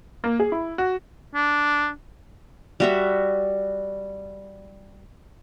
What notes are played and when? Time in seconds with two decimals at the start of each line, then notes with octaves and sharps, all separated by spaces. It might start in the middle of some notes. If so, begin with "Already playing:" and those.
0.24 A#3
0.40 G#4
0.52 E4
0.78 F#4
1.35 D4
2.80 G3 F#4 E5